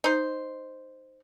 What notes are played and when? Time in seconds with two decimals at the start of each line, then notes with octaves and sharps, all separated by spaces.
0.04 D#4 C5